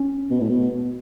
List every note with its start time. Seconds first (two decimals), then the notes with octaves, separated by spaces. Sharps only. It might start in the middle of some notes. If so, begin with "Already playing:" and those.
Already playing: C#4
0.30 B2
0.40 A2
0.49 B2